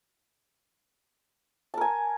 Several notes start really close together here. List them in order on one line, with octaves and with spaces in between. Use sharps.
A5 A#4 G#5